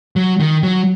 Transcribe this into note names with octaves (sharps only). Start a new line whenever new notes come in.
F#3
D#3
F#3